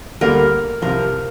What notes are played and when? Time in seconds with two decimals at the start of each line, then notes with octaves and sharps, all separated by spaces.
0.21 D2 D3 G3 A#3 A#4
0.82 C2 C3 F3 A#4